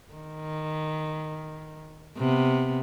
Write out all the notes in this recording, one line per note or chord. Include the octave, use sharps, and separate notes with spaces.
D#3
C3 B3